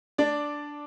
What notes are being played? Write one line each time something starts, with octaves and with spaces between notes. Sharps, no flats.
D4 D5